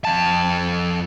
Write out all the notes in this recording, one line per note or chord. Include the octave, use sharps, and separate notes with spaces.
F2 A5